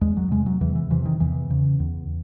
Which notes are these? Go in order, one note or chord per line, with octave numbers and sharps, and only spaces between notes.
E2 G#3
F#3
C3 G#3
F#3
E2 E3
E3
C3 E3
D#3
E2 E3
C#3
E2